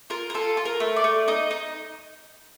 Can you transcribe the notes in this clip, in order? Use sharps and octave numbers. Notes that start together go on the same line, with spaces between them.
F4 A#4
A#4
F4 A4
F4
A#4
A3
D5
A3
D#4 D#5
D#4